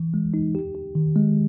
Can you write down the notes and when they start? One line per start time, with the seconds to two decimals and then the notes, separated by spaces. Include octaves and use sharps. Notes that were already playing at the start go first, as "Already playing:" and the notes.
Already playing: E3
0.14 G#3
0.34 D#4
0.55 G4
0.75 G4
0.95 D#3
1.16 G#3